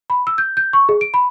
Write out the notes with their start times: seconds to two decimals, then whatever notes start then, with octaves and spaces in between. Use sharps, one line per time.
0.10 B5
0.27 E6
0.38 G6
0.57 G6
0.73 C#6
0.89 G#4
1.01 D7
1.14 B5